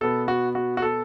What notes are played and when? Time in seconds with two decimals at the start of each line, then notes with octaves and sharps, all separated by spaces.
0.01 B2 B3 A4
0.28 F#4
0.55 F#4
0.77 F#4
0.82 A4